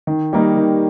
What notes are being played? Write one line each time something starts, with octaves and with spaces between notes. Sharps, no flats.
D#3
G3 A#3 D#4
D#3